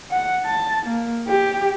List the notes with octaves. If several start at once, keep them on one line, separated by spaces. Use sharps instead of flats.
F#5
A5
A#3
G4